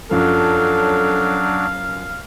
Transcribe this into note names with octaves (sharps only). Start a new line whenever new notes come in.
F#2 F3 F#3 D4 A4 F5